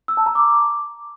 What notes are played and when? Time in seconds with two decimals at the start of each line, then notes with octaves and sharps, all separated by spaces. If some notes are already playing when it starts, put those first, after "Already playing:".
0.08 E6
0.17 A5
0.26 A#5
0.35 D6